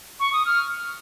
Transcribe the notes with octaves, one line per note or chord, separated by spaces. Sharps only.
C#6
D#6
F6